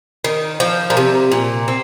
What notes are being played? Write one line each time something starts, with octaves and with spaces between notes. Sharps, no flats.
D#3
F3
A#2
C3
A#2
C4